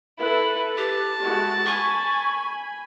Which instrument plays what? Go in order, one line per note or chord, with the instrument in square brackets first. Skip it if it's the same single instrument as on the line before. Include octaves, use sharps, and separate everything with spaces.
[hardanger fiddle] E4 [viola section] A4 B4
[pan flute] G4 [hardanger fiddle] A5
[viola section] G#3 E4 F#4
[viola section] G#5 B5 [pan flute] C#6